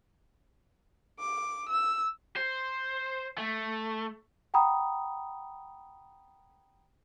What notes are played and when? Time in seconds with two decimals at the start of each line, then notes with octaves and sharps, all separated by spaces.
1.20 D6
1.69 E6
2.36 C5
3.38 A3
4.54 F#5 G5 A#5 B5 D#6